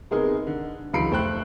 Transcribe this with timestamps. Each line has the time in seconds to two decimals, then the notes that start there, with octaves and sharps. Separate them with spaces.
0.11 C3 G#3 B3 D#4 G#4 A#4
0.47 D3
0.93 C#2 E3 F#3 B5 C7 D7
1.11 F1 A3 C5 G5 F#6